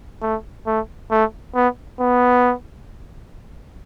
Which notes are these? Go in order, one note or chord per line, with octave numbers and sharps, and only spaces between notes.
A3
A3
A3
B3
B3